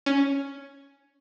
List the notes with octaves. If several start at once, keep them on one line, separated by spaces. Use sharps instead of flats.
C#4